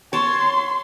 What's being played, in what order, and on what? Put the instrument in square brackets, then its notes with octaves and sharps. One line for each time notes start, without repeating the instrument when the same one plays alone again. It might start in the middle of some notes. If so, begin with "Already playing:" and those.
[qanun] C#5 A5 [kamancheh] C6